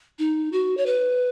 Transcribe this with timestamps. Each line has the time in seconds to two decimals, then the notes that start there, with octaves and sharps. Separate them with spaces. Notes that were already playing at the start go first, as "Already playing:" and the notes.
0.19 D#4
0.52 F#4
0.77 C#5
0.86 B4